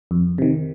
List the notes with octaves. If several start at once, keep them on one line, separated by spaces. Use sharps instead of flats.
F2
C3 D#3